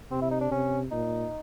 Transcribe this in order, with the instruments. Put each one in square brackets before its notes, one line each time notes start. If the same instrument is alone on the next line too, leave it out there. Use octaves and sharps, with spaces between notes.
[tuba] C3 [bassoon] C4
[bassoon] E4
D#4
D4
[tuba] C3 [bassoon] C#4
[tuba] A#2 [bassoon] D#4